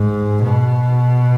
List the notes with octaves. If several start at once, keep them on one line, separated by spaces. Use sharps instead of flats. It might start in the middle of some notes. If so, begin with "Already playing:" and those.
Already playing: G#2
B2